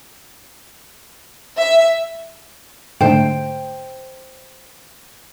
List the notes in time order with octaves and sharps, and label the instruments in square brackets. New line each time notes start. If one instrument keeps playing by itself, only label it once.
[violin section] E5
[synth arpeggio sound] G#2 D3 A3 [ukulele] C5 G5